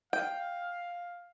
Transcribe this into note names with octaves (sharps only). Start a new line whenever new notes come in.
F5 G5